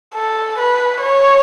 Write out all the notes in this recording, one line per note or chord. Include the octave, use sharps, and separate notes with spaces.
A4
B4
C#5